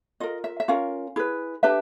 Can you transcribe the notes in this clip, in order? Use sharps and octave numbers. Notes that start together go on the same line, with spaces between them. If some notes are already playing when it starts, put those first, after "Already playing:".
F4 A#4 D#5
E5
E5
C#4 F4 A#4 F5
E4 G#4 B4
D4 G4 B4 E5